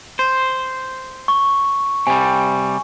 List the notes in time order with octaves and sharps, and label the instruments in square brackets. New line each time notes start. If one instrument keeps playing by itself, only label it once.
[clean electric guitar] C5
[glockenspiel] C#6
[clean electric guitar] C3 G3 [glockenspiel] G#5